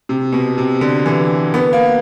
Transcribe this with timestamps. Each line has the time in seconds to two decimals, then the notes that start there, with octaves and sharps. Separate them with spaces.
0.09 C3
0.32 B2
0.58 C3
0.81 D3
1.06 E3
1.54 B3
1.73 A#3